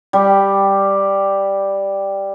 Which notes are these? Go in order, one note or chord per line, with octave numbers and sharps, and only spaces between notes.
G3 G4